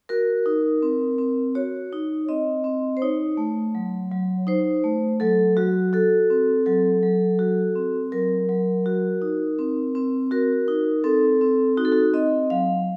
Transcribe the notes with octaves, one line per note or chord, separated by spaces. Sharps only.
F#4 A#4
D#4
C4
C4
F#4 C#5
D#4
C4 D#5
C4
C5
D#4 C#5
A3
F#3
F#3
D#4 C5
A3
F#3 A4
F#3 F#4
F#4 A4
C4
F#3 A4
F#3
F#4
C4
F#3 A#4
F#3
F#4
D#4
C4
C4
F#4 A#4
D#4
C4 A4
C4
D#4 F#4
A4
F#4
C4 D#5
F#3 F5